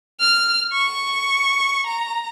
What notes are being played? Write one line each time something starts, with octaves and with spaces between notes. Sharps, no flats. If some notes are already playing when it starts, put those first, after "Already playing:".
F6
C#6
A#5